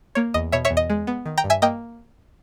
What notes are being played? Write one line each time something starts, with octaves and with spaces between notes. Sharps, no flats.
A#3 C#5
E2 D#5
B2 C#5 E5
C#5 E5
E2
D#5
G#3
B3
D#3
G5 A#5
G2
E5 G#5
A#3 D#5 G5